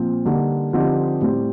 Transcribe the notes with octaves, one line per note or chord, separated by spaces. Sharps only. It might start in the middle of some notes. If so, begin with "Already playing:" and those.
Already playing: A#2 F3 C4
D3 G3 A#3 D#4
D3 F3 C4 D#4 G4
A2 G3 C4